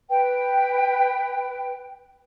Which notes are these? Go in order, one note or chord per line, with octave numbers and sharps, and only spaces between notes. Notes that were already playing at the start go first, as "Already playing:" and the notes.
B4 G5